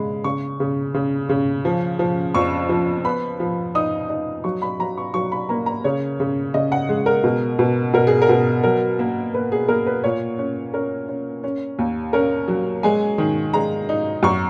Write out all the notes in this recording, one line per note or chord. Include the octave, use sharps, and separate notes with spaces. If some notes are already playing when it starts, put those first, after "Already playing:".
Already playing: C#3 G#3 B5
C#3 C#6
C#3
C#3
C#3
F3
F3
F2 C#6
F3
B3 B5
F3
D#4 D#6
D#4
F#3 C#6
B5
F#3 A#5
C#6
F#3 C#6
B5
A#3 A#5
A#5
C#3 C#5
C#3
C#3 D#5
F#5
G#3
A#4
B2
B2
B2 A#4
G#4
A#4
B2
F#3 A#4
A#3
A#3 B4
G#4
A#3 A#4
B4
A#2 C#5
C#4
C#4 A#4
C#4
C#4
D#2
C#4 A#4
F#3
G#3 G#5
D#3
G#3 A#5
D#4
F#2 C#6